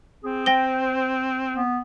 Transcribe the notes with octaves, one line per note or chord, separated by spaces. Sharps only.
C4 G#4
C5 G5 A#6 G7
B3